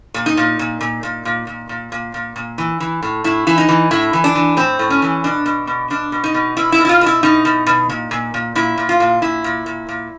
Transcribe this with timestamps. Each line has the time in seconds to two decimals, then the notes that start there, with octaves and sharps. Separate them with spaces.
0.14 A#2
0.26 D#4
0.37 A#2
0.59 A#2
0.81 A#2
1.03 A#2
1.25 A#2
1.47 A#2
1.69 A#2
1.92 A#2
2.14 A#2
2.36 A#2
2.58 E3
2.80 E3
3.02 A2
3.24 A2 E4
3.47 E3 E4
3.58 D#4
3.69 E3
3.91 A2 E4
4.13 E3
4.24 D4
4.35 E3
4.57 A2 C4
4.79 A2
4.90 C#4
5.02 E3
5.24 B2 D4
5.46 B2
5.67 B2
5.90 B2 D4
6.12 B2
6.24 D#4
6.34 B2
6.57 B2 E4
6.72 E4
6.78 B2
6.85 E4
6.89 F4
7.01 B2
7.06 E4
7.23 B2 D#4
7.45 B2
7.66 B2
7.89 A#2
8.11 A#2
8.34 A#2
8.55 A#2 E4
8.77 A#2
8.89 F4
9.00 A#2
9.22 A#2 E4
9.44 A#2
9.66 A#2
9.88 A#2